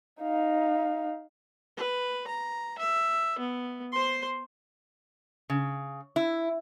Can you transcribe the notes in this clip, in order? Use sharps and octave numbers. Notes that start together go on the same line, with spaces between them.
D#4 F5
B4
A#5
E5
B3
C5 C6
C#3
E4